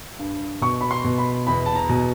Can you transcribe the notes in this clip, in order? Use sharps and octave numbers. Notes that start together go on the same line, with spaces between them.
G2
B2 C#6
B5
C6
B2
B5
E2 B5
A5
A#5
B2